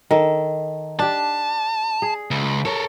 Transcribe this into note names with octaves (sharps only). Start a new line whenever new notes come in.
D#3 A4
D4 G4 A5
G#4
C#2
A4 A#4 C#5